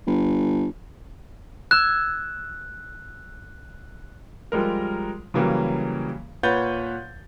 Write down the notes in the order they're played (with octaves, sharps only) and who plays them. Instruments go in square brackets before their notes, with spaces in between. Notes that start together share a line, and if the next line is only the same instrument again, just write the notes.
[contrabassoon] G1
[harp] E6 G#6 E7 [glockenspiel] F#6
[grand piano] F3 G3 G#3 A#4
C#3 E3 F#3 G3 A#3
A#2 B4 C#5 F#5 G6 A6